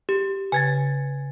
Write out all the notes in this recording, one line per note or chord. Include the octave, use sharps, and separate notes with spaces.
G4
C#3 B4 G#5 G#6 A6